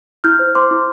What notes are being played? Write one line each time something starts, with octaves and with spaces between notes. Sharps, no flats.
E4 F6 G6
C5
C5 C6 D6
E4